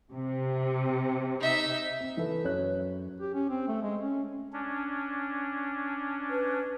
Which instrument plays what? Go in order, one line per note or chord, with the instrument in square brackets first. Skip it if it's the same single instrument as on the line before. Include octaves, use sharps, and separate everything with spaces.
[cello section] C3
[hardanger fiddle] D#4 E5
[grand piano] C4
E3 E4 A4 B4
F#2 C#5 F#6
[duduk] G4
C#4
C4
A3
G#3
C#4
[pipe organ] C#4 D4
[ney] B4